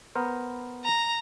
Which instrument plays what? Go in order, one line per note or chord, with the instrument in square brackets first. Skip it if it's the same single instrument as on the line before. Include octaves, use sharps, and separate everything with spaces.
[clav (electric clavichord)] B3 A#4 C5
[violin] A#5